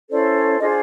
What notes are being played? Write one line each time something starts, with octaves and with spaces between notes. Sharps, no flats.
C#4 E4 A4 C5 D5
C#5
D4 F4 G#4 C5 D#5